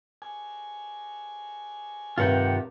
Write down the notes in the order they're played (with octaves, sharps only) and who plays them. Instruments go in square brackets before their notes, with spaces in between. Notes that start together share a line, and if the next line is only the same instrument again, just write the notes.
[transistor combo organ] G#5
[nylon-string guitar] G2 C3 D#3 [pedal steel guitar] F4 F#5 G5